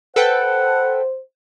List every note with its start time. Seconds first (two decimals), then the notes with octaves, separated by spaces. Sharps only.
0.16 A4 B4 C5 F#5 G5